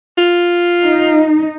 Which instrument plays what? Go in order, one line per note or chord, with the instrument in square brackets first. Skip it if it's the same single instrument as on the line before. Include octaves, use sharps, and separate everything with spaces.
[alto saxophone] F4
[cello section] D#4